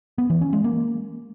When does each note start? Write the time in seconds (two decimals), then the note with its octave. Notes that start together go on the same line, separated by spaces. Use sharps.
0.18 B3
0.30 E3
0.41 C#4
0.53 G#3
0.64 A#3